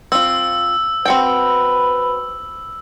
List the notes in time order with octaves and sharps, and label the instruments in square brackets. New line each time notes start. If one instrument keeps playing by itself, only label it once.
[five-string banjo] C4 F4 [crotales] E6
[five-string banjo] C4 F#4 G5 [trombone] B4